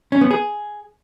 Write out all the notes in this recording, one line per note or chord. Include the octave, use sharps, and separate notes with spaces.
C#4
B3
G#4